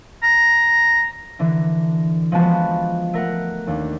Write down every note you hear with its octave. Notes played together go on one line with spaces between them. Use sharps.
A#5
D3 E3 D4
F3 G#3 B3 F#4 A5 B5
A3 A#4 F#5
D#2 D4